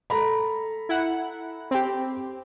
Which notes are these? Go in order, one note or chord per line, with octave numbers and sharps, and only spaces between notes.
A4 A#5 B5
E4 F#5
C4 G4